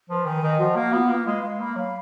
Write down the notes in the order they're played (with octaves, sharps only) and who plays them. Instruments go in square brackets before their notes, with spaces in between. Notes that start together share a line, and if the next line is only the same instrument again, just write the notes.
[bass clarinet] F3 [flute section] B4
[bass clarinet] D#3 [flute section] G#5
[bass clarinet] D#3 [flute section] D#5
[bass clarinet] F3 [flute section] F#4
[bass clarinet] A#3 [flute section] F5
[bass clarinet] B3 [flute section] F4
[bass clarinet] A#3 [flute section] B4
[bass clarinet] G#3 [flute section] F5
[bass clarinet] G#3 [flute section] F5
[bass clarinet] A#3 [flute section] B5
[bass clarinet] F#3 [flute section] F5